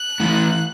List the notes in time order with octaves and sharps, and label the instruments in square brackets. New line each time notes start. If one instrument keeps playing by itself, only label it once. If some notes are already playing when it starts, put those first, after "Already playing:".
Already playing: [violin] F#6
[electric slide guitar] E3 A3 E4